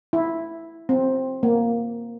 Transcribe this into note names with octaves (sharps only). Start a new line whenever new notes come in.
E4
C4
A#3